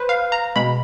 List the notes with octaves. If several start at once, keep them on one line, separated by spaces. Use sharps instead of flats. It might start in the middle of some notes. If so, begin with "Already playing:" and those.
Already playing: B4 C5
F5
A#5
B2 G#3 B5